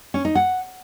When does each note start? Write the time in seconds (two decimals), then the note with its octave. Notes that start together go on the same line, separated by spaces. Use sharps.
0.14 C#4
0.25 D#4
0.35 F#5